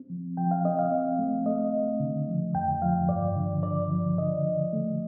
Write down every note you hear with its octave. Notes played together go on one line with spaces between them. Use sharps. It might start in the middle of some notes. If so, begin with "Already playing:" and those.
Already playing: C4
F3
F3 G5
F5
C4 D#5
F5
C4
A3
A3 D#5
A3
D3
F3
F2 G5
F3 F5
G2 D5
D3
D3 D5
F3
D3 D#5
D3
A3